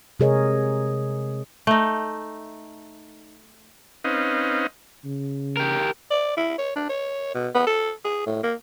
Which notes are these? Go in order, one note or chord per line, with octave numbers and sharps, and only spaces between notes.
C3 G#3 G#4 A#4 C#5 D#5
A3 D#4
C4 C#4 D#4 B4 D#5 F5
C#3
G4 A#4
D5
E4
C#5
D4
C#5
B2
B3
A4
G#4
A2
A#3